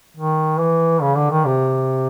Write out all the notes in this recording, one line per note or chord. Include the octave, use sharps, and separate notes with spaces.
D#3
E3
C#3
D3
D#3
C3